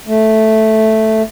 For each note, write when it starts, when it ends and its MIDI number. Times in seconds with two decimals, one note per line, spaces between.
0.07 1.22 57